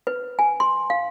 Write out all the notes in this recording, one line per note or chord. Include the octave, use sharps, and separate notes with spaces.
B4
G#5
C6
F5